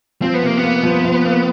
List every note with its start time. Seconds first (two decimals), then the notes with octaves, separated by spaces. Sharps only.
0.22 F3 C4
0.34 B3
0.42 C3 A#3
0.57 B3
0.63 A#3
0.83 F3
1.05 F3
1.25 A#3